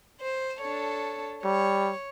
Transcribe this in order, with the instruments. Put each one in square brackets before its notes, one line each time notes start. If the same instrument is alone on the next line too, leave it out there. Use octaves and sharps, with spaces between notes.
[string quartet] C5
D4 A4 C#5
[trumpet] G3 [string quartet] C#5